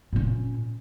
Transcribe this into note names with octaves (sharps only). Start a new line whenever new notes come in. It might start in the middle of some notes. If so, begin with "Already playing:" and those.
A#2 C#4